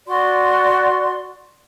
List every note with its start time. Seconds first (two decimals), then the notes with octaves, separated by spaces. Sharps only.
0.07 F#4 D5 C6